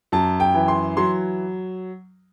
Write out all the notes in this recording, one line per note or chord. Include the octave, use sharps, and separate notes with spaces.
F#2 A5
G5
E3
C6
F#3 C6